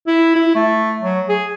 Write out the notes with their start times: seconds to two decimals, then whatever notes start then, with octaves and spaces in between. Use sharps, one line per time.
0.07 E4
0.36 E4
0.55 A3
1.02 F#3
1.29 G#4